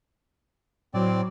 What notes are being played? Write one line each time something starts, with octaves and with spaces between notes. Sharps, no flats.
A2 F#3 C4 D5